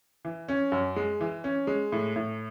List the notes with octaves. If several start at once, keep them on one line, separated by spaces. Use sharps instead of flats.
E3
C#4
F#2
G#3
E3
C#4
G#3
A2
A2